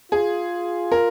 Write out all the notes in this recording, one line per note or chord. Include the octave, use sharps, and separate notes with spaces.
F4 G#4
A#4